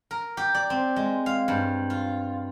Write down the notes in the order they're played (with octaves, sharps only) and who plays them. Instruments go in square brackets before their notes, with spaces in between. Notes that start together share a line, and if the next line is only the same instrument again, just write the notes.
[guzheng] A#4
G4
D5
C4
G#3
F5
G2
F4